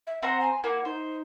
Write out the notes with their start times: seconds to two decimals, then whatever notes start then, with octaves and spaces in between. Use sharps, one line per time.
0.07 E5
0.23 C4 C5 F#5 A#5
0.41 G#5
0.64 A#3 E4 F#5
0.85 D#4 C5